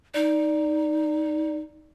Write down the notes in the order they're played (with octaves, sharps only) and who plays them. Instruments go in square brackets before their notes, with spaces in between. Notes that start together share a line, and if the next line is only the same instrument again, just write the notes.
[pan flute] D#4 [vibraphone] D5